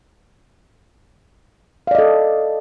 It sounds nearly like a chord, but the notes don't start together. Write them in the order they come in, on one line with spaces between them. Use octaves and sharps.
F5 D5 D#5 A4